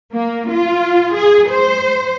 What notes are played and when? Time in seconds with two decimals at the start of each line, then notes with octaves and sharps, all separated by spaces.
0.13 A#3
0.50 F4
1.16 G#4
1.50 C5